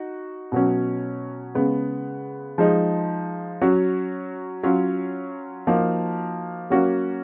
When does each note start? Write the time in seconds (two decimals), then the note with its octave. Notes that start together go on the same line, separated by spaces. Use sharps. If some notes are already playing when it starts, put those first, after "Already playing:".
Already playing: D#4 F#4
0.52 B2 F#3 C#4
1.55 C#3 G#3 B3
2.58 F3 G#3 D#4
3.61 F#3 C#4 F#4
4.63 F#3 C#4 F4
5.67 F3 A#3 D#4 F#4
6.70 F#3 A#3 C#4 F#4